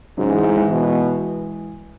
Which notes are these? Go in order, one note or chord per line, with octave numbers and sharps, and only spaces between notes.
G#2 C#3 F#3
E3 G#3
E3 G#3
E3 G#3
B2